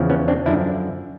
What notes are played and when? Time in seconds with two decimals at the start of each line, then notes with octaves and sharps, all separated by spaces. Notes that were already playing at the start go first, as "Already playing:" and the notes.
Already playing: E2 C#3 F3
0.09 B3 C#4
0.28 C4 D4
0.46 F#2 D3 F3 D4 E4